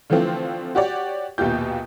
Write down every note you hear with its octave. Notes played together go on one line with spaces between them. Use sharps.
D3 E3 F3 A3 C4 F4
F#4 G4 C#5 D5 F#5
A#1 D#2 B2 F4 G4 G6